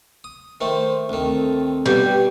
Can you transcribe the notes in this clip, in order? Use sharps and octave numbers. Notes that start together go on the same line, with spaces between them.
D#6
D#3 A3 C5
D2 D#3 C4 A4
G2 B2 D3 G3